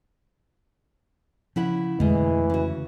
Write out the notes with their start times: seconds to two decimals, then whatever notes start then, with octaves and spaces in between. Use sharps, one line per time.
1.56 C#3 F3 E4 F#5
2.00 F2 B2 D3 E3 G#3 A3
2.50 C#3 F#4